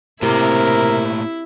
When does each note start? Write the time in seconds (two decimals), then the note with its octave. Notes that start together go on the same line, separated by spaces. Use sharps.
0.22 A2 C3 A#3 E4 A#4